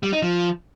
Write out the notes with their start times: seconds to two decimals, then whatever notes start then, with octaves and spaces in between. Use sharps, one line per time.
0.03 G3
0.13 D#4
0.22 F3